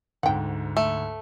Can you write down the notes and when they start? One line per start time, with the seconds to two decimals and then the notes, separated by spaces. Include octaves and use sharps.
0.23 D2 G#2 F#5 G5
0.77 A3